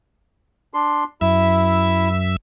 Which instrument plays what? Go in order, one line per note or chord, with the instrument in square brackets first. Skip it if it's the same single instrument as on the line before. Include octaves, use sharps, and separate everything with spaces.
[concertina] D4 C6
[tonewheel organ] F#2 E5 [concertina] E4